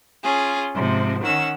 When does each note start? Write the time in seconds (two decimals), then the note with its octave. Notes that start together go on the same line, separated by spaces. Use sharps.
0.23 C#4 F4 G#4
0.75 G#2 C3 F3
1.22 D#3 C#4 F#5 E6